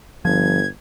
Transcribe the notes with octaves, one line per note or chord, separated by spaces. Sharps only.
G1 F3 G#6